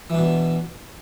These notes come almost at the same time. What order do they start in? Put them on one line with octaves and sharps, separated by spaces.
E3 D4 B2